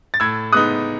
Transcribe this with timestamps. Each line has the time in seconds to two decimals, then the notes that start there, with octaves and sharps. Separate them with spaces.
0.14 A6
0.20 A2 E6 G#6
0.53 G#3 B3 D#4 D#6 F#6